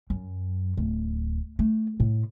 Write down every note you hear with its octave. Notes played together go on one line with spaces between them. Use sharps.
F#2
D1
A3
A2